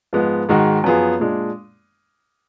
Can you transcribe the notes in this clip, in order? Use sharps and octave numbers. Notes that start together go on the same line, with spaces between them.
G#2 F3 G#3 B3
G#2 D#3 G#3 D#4 F#4
F#2 F3 B3 F4 G#4
A#2 G#3 D4